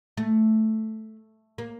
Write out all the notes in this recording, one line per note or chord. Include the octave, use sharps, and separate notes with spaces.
A3
A#3